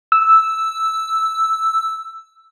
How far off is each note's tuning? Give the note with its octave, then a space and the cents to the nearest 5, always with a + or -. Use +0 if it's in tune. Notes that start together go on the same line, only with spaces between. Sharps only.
E6 -5